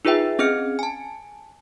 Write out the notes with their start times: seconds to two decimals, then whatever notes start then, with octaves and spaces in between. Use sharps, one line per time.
0.05 D#4 F4 G#4 B4 E5 G5
0.39 C4 C#4 G#4 D#5 F6 C#7
0.79 G#5 A5